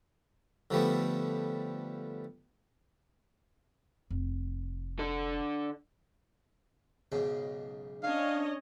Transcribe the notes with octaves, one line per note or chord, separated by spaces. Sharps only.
D3 F3 G3 A3 B3
F1
D3 A4
B1 G#2 C#3
C#4 D4 C#5 D#5 F5